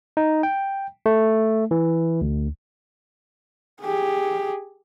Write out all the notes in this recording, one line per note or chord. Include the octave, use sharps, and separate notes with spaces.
D#4
G5
A3
E3
D2
G4 G#4